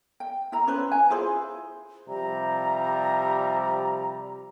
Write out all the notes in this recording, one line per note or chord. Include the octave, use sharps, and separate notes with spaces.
G5
E4 A#5
C#4 B4 C5
G#5
E4 F4 G#4 C5
C3 F3 G3 A#5